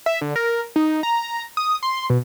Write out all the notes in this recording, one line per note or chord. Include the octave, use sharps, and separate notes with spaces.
E5
D3
A#4
D#4
A#5
D#6
C6
B2